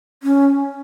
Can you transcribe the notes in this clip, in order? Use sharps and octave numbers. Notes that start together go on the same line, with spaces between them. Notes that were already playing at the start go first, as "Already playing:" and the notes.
C#4